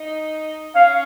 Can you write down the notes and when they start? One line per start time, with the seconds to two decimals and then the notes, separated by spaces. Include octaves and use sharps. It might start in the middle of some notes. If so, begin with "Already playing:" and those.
Already playing: D#4
0.75 C#4 F5